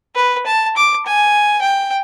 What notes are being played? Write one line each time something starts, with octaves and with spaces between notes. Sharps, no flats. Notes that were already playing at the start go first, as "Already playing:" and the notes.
B4
A5
D6
G#5
G5